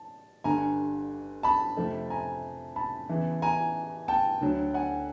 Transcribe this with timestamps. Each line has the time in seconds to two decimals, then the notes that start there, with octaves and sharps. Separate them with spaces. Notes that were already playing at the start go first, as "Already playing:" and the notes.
Already playing: A5
0.44 G1 G2 D3 G#5 A#5
1.43 A5 B5
1.77 F2 C3 F3 A3
2.10 G#5 A#5
2.76 A5 B5
3.09 E2 C#3 E3
3.42 G#5 A#5
4.08 G5 A5
4.41 D2 D3 F#3
4.74 F#5 G#5